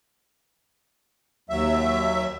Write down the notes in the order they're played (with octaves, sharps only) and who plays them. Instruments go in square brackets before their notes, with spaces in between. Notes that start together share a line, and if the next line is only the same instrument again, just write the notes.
[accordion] D#2 F#3 E5